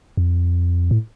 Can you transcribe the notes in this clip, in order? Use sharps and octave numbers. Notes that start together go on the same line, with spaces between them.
F2
A2